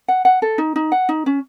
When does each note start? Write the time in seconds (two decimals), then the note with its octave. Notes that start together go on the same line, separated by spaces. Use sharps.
0.08 F#5
0.25 F#5
0.42 A4
0.58 D#4
0.76 D#4
0.92 F#5
1.09 D#4
1.26 C#4